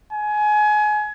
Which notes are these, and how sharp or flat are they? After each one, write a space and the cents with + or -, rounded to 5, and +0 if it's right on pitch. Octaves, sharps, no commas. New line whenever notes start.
G#5 +25